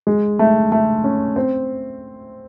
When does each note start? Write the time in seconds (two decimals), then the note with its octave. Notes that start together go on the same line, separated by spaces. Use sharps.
0.07 G#3
0.39 A3
0.72 A3
1.04 C#4
1.36 C4